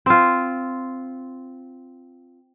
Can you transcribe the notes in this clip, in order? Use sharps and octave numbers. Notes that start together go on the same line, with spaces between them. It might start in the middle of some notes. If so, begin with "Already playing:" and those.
C4 F4